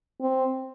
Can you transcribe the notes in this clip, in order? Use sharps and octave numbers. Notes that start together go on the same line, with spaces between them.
C4